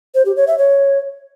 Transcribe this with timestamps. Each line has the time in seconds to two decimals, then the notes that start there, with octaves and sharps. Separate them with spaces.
0.15 C5
0.26 G4
0.36 C#5
0.47 E5
0.58 C#5